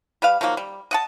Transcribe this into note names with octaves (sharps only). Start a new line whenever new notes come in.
G3 B4 F5
D#3 F3 F#3 A#3
G3
D#5 F#5 A5